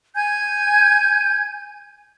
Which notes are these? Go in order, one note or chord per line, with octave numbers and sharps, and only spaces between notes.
G#5 G6 G#6